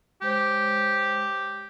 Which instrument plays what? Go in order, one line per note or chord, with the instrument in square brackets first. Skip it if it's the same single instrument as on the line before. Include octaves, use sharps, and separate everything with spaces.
[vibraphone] G#3 C5 C#5 [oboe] G4